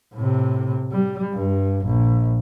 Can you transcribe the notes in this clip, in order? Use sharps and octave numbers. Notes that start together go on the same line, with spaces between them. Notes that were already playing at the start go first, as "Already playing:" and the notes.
A2 C3
G3
G2
A#1